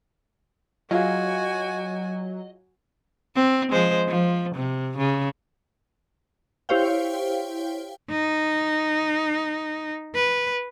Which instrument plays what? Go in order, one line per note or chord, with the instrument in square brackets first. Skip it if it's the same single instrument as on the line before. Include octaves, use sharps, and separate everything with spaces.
[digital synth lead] F#3 [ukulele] F4 G#4 F5 [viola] F#4 G#5 [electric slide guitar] D#5
[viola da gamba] C4
F3 G#3 C5
F3
C3
C#3
[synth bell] E4 G4 C5 C#5 F5 G5
[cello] D#4
B4